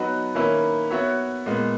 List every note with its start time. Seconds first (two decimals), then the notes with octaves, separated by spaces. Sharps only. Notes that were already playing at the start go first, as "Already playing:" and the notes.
Already playing: F#3 B3 D#4 F#4 B4
0.35 D#3 A#3 C#4 E4 B4
0.91 B3 F#4 C#5 E5
1.46 A#2 G#3 B3